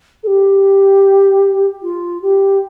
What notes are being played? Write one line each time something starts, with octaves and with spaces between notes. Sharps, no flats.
A4
G4
F4
G4